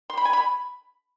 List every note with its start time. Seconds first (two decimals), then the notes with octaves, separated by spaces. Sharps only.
0.10 C6
0.17 B5
0.25 G#5
0.33 B5